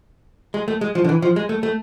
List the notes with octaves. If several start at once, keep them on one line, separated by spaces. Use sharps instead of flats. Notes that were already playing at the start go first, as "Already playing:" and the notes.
G#3
A3
G#3
F3
D3
E3
F3
G#3
A3
A3